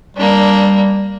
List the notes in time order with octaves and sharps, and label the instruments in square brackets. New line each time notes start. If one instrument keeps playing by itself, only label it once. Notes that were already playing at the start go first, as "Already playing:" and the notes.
[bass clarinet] G3 [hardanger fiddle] A#3 D4